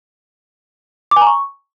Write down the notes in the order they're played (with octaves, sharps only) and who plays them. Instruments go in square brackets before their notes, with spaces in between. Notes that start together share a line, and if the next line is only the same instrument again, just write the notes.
[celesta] D6
G#5
A#5
C#6